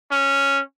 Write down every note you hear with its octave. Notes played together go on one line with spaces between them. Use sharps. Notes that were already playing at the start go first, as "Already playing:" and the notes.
C#4